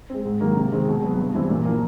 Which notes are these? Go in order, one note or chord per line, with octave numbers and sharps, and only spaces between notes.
G#3 C4
G#2
D#3 F#3 A#3
C3
D#3 G#3 C4
B2
F#3 B3
G2
E3 G3 C4
A#2
F3 A#3